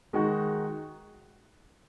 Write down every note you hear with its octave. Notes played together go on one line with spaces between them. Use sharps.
D#3 G#3 D#4 F#4